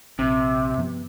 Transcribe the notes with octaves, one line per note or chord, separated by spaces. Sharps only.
A#1 C3
G2 F3 B3